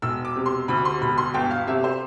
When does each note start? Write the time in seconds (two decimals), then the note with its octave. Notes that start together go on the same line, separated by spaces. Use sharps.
0.02 E1 E6
0.25 D6
0.36 C3
0.46 C6
0.68 D2 B5
0.85 C6
1.01 E1 B5
1.18 C6
1.34 G1 G5
1.50 F5
1.67 C3 E5
1.84 C5